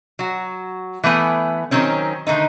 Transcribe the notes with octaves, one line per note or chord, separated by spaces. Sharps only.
F#3 F#4
E3 A3 B3 G#5
D#3 F#3 C4 C#4
D3 D#3 A3 D#4